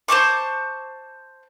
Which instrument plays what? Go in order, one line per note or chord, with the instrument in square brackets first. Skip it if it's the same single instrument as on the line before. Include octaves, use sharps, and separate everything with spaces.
[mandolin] C5 A5 C#6 D6